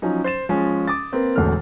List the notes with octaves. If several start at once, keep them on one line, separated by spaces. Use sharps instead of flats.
F3 F#3 C#4 D#4
C5 A6 E7
F3 G#3 C#4
D6 D#6 A6
A#3 C4 A#4 B4
E1 E2 A2 D3 A4 F6